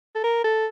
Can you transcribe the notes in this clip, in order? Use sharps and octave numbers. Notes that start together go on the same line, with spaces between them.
A4
A#4
A4